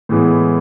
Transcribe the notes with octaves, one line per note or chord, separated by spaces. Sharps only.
A2 E3 G#3 B3